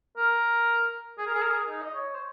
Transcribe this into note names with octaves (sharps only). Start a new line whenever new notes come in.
A#4
G#4
A#4
G#4
A#4
G#4
D#4
D#5
C#5
C5